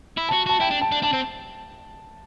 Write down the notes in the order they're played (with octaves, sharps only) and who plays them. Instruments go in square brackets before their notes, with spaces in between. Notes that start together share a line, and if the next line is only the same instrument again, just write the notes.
[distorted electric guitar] E4
[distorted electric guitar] F#4 [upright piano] A5
[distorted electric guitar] F#4 [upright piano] A5
[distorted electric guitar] E4 [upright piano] G5
[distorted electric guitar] D4
[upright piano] A5
[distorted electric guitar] D4
[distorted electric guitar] D4 [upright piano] A5
[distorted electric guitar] C4